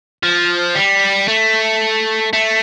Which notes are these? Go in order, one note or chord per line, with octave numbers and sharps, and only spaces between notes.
F3
G3
A3
A3